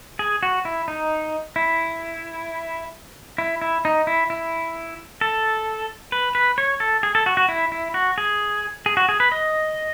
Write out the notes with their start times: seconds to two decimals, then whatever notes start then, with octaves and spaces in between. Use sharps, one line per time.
0.19 G#4
0.43 F#4
0.65 E4
0.88 D#4
1.56 E4
3.38 E4
3.62 E4
3.85 D#4
4.07 E4
4.30 E4
5.21 A4
6.12 B4
6.35 B4
6.58 C#5
6.80 A4
7.03 G#4
7.15 A4
7.26 F#4
7.37 F#4
7.49 E4
7.72 E4
7.94 F#4
8.18 G#4
8.86 G#4
8.97 F#4
9.09 G#4
9.20 B4
9.32 D#5